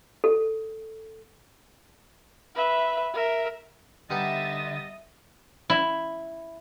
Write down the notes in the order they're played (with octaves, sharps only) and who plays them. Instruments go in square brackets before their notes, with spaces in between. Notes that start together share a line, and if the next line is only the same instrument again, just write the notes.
[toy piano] A4
[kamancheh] B4 E5
A#4 E5
[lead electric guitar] D3 [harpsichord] G3 B3 D#4 [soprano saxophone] D#5 [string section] E5 A6
[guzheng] E4